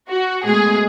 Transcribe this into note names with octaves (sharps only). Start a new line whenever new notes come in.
F#4
B2 G#3 A3 G#4